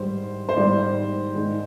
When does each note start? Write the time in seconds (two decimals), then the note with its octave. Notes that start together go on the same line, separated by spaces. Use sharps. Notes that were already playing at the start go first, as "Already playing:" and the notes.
Already playing: G#2 D#3 G3 C5
0.49 C5
0.56 G#2 D#3 G3 D5
1.35 G#2 D#3 G#3